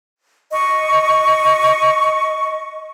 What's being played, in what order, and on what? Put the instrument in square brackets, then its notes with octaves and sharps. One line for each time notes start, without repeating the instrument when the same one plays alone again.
[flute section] D#5 C#6